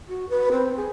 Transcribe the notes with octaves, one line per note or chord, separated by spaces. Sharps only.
F#4
B4
C4
G#4